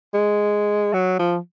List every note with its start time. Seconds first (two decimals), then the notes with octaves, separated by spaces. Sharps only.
0.14 G#3
0.94 F#3
1.20 F3